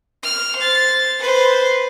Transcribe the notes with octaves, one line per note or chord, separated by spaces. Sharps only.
F6
C5 A6
B4 C5